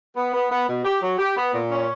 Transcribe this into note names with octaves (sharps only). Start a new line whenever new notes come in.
B3
B3
B3
B2
G4
F#3
G4
B3
A#2
C#4